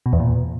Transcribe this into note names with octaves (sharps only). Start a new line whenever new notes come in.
B2
E2
A#2